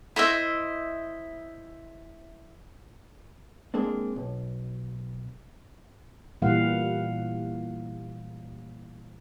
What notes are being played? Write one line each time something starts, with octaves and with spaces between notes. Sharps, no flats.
E4 C5 D#5 E5
G#3 A#3 C4 D4
B1
A#2 E3 G3 F5 F#5